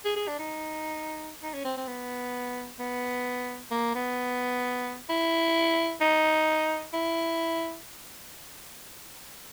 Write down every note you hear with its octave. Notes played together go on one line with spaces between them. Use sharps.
G#4
G#4
D4
D#4
D#4
C#4
C4
C4
B3
B3
A#3
B3
E4
D#4
E4